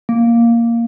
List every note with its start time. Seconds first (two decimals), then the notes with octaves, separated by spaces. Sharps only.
0.09 A#3